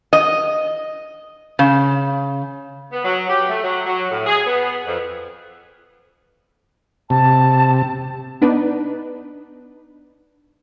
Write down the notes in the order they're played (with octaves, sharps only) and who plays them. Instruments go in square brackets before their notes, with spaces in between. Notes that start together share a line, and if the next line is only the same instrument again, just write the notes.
[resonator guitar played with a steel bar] D#5
C#3
[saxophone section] B3
F#3
G4
A3
F#3
F#3
A2
G#4
B3
F2
[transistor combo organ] C3 [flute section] A5
[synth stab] B3 D4 D#4 B4